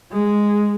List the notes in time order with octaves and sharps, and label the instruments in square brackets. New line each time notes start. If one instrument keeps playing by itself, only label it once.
[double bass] G#3